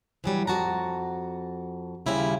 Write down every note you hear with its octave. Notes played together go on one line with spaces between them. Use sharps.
E3 F#3 G3
F2 F#4 A5 A#5
D#2 C#3 G3 E4 F4